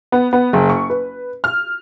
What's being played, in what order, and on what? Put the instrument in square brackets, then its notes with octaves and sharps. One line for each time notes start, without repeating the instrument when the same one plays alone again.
[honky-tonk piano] B3
B3
F#1
C#6
B4
F6